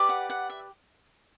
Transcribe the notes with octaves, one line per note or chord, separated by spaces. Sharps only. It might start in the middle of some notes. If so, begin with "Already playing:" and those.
Already playing: G4 B4 D5
F#5
F#5
E5